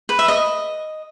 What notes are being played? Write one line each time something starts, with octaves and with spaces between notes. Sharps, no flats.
B4
E5
D#5